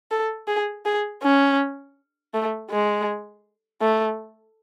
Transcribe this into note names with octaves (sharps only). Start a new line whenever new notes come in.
A4
G#4
G#4
C#4
A3
G#3
A3